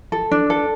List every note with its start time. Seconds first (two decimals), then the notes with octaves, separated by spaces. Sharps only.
0.12 A4
0.31 D4
0.50 A4